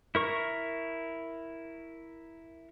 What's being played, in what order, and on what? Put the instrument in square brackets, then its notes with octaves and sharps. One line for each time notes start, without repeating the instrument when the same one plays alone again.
[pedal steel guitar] E4 A#4 C#6